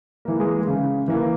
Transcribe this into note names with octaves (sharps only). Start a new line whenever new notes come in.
E3 A#3
G#3
C#3
E3 A#3